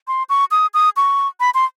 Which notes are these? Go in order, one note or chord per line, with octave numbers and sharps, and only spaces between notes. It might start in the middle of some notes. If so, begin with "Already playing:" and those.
C6
C#6
D#6
D#6
C#6
B5
C6